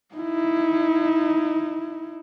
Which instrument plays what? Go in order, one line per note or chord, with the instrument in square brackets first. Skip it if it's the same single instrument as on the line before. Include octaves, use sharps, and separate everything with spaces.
[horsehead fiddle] D#4 E4